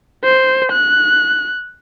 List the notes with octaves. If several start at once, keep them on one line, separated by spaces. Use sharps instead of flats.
C5
F#6